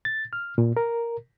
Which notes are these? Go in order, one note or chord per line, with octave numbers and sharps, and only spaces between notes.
A6
F6
A#2
A#4